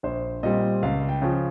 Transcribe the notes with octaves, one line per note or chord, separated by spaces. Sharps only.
A#1 C5
A#2 G3 C4 D#5
C#2 F5
G5
C#3 F3